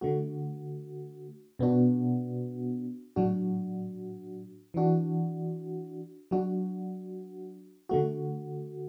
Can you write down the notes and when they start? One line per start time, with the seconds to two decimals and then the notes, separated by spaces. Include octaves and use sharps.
0.01 D3 A3 F#4
1.59 B2 B3 D4 F#4
3.16 A2 F#3 D4 F#4
4.74 E3 D4 F#4
6.31 F#3 D4 F#4
7.89 D3 A3 F#4